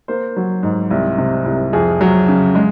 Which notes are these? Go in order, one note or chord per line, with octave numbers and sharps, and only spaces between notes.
A#3 C5
F#3
G#2
C2
C3
C2
F2 G#4
F#3
C#3
G#3